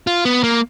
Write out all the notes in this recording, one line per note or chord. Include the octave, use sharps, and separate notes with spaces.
F4
B3
A#3